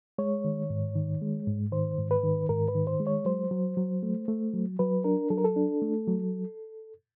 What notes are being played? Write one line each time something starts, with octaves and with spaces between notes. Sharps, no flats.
G#3 C#5
D#3
G#2
D#3
G#3
G#2
D#3 C5
G#2
B4
D#3
G#2 A#4
B4
D#3
C5
G#3
C#5
F#3 C5
F#3
F#3
A3
A3
F#3
F#3 B4
D4 A#4
F#3 A4
A#4
A4
D4
A3
F#3